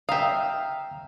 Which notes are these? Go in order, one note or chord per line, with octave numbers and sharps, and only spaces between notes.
E5 F5 G5 A#5 D#6